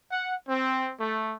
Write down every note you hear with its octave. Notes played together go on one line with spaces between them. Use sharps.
F#5
C4
A3